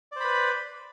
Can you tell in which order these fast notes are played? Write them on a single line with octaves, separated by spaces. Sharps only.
D5 C5 B5 B4